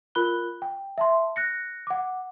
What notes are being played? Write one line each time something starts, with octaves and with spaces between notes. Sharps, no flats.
F4 A#4 B5 F#6 G7
G5
E5 A5 C6
F#6 A#6 C#7
F#5 D6